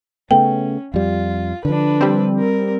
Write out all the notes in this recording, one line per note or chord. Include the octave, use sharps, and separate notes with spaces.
C#3 A3 B3 C#4 G5
F2 G3 F4
D3 F3 D4 B4
G3 C4
A#4